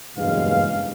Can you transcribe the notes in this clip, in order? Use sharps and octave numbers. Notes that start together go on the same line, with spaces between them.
F#1 E2 G2 B2 G#3 F5